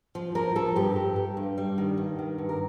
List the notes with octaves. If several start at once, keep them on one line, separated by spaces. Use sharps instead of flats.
F3
F3 A#4
F3 A4
G2 G4
G2
G2
G2
G3
D#3
G2
D#3
G2
A#4